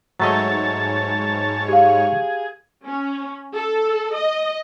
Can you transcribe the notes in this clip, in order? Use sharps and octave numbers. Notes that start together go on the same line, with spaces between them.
G#2 F#3 A3 C#5 D#5 A5
G4 G#4 F5
C#4
A4
D#5